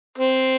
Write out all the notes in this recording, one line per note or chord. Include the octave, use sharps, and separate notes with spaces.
C4